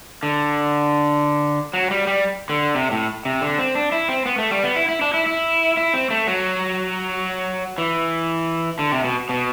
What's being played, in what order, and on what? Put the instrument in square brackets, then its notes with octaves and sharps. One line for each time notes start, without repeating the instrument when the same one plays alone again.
[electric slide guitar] D3
F#3
G3
G3
D3
C3
A2
C3
D3
C4
D4
E4
C4
B3
A3
G3
B3
E4
E4
D4
E4
E4
E4
C4
A3
F#3
E3
D3
C3
B2
B2